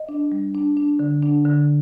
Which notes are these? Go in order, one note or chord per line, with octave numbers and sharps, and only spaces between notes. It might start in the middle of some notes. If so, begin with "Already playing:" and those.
Already playing: D#5
D4
G3
D4
D4
D3
D4
D3